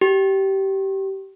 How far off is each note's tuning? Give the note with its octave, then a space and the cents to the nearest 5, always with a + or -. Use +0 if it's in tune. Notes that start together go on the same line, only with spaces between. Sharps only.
G4 -20